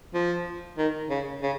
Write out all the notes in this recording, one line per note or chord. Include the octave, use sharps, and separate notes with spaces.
F3
D#3
C#3
C#3